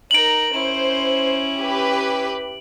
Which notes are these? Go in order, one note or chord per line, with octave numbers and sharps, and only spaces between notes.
D#4 A#4 D7 F#7
C#4 E4 C5
G4 B4